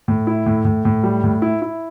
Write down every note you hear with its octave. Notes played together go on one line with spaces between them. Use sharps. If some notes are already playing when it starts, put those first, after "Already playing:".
A2
E4
A2
A2
A2
G3
A2
E4
E4